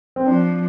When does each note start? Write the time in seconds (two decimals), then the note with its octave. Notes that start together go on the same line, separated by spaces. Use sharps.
0.16 C4
0.26 F3 D4